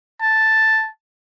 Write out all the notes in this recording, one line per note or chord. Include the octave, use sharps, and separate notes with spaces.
A5